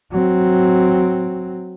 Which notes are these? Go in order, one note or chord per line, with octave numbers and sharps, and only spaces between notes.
F#3 C4